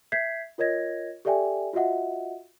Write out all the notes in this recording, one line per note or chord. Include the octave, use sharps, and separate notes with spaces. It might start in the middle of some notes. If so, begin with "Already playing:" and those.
E5 G6 G#6 B6 C7
F4 A#4 C#5 D#5 G#6 A#6
G4 A4 D5 E5 G5 G#5
F4 F#4 D#5 E5 F#5